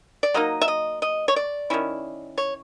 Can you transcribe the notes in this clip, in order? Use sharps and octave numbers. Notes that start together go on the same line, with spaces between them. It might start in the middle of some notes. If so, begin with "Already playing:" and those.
D5
F#3 A#3 D#4 D#5
E5
D#5
D#5
C#5
D5
D#3 G#3 C#4 E4
C#5